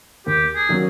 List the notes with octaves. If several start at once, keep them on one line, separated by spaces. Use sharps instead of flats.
D#2 G4
G#4
D#3 F#3 A#3 C#4